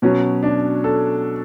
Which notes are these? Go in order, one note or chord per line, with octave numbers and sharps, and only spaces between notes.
B2 F#3 C#4
D4
A4